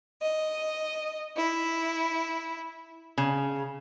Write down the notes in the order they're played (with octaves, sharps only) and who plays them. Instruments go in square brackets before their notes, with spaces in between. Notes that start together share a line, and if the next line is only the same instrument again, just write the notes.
[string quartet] D#5
E4
[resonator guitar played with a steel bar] C#3